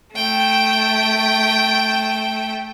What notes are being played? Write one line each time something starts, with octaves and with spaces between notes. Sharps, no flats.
A3 G5